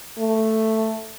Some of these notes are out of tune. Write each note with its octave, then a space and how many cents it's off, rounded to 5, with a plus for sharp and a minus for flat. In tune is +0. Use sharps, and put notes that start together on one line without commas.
A3 +5